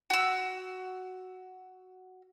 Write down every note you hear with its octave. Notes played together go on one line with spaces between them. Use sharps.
F#4 E6